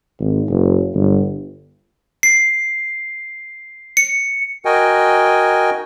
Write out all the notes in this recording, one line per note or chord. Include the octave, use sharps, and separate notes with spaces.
G#1
F#1
G1
C7
C#7
F#4 A#4 D#5 G5 G#5